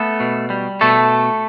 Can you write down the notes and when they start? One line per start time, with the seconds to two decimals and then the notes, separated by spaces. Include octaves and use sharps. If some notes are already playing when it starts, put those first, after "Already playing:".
Already playing: A3 B3 A4
0.20 B2
0.50 G3
0.81 B2 A3 A4